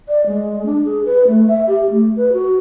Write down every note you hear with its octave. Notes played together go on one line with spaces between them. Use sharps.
D5
G#3
D4
G#4
B4
A3
E5
G4
A3
B4
F#4